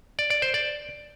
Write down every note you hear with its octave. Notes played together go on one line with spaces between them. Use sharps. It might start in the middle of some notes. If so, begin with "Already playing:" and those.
D5
D5
C5
D5